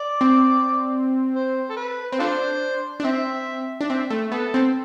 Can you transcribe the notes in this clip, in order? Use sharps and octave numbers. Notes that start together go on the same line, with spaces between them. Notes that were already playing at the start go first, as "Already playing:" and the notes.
Already playing: D5
C4
C5
A4
B4
C4
D4 F4 A4 C5
D4
C4 E5
D4
C4 E5
A3
B3 A4
C4